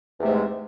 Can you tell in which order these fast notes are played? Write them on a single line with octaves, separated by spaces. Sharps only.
E2 C3 A3 G#2 G#3